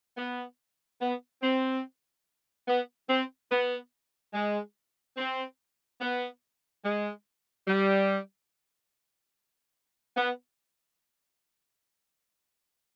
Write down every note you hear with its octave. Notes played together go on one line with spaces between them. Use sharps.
B3
B3
C4
B3
C4
B3
G#3
C4
B3
G#3
G3
B3